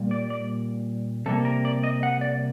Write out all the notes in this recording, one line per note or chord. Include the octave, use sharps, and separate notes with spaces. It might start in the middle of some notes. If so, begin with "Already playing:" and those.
Already playing: A#2 G3
D5
D5
C3 G3 A#3 A4
A#4
D5
D#5
F#5
D5